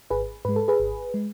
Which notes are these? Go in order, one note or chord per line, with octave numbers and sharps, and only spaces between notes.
G#1 G#4 B4
G#2 G#3 B4
A4
G#4 B4
G#1
G#3